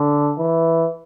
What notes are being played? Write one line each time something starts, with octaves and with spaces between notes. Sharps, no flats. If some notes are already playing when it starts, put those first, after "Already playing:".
Already playing: D3
E3